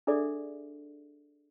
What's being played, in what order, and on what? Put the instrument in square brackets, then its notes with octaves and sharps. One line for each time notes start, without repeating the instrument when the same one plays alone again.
[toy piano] D4 G#4 A4 D5 E5